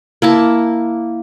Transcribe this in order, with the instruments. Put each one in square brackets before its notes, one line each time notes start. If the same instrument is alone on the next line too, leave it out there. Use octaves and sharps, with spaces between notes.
[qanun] A#3 E4 A5